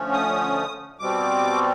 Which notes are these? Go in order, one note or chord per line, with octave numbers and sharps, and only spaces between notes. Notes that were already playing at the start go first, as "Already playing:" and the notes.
Already playing: D3 F3 A3 C#4
D#6
B2 G3 C4 D6